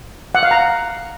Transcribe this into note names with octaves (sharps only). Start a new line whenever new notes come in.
F#5
F5
A#5